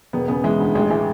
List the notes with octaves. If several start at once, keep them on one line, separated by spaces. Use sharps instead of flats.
E1 B3
C#3 B3
E3 G#3
D2
A1 G#3
E3 G#3